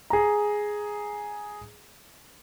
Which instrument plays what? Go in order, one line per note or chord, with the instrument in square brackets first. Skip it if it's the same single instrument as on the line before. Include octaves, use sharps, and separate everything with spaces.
[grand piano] G#4 A#5